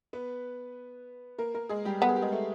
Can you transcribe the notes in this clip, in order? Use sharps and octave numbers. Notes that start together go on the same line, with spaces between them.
B3 B4
A#3 A#4
A#3 A#4
G#3 G#4
G3 G4
B3 A4
G#4
G4
G#3 G#4
A3 A4